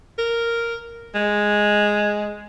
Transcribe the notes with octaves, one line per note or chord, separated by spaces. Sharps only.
A#4
G#3